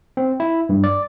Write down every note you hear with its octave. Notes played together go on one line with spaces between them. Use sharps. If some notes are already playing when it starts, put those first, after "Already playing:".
C4
E4
G2
D5